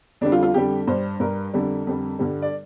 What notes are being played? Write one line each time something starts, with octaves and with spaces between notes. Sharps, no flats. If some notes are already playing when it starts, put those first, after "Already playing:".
F2 D3 G3 D4
F4
F4
F2 D3 G3 G4
G2 G3 C5
G2 G3 A#4
F2 D3 G3
F2 D3 G3
G2 D3 G3
D5